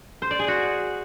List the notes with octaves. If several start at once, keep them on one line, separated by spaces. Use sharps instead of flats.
C5
D5
G#4
F#4